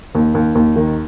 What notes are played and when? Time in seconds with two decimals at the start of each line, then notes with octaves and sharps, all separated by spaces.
0.15 D#2
0.35 D#2
0.55 D#2
0.76 D#3